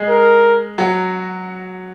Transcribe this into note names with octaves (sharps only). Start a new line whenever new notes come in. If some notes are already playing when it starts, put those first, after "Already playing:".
Already playing: G#3 G#4
A#4
F#3 F#4